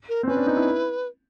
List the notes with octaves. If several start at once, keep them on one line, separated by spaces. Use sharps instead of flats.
A#4
C4
C#4 B4
D4
D#4
E4